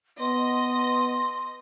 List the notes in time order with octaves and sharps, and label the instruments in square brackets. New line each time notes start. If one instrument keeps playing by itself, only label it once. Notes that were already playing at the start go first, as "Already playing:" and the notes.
[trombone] B3 [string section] D#5 A#6 [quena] C6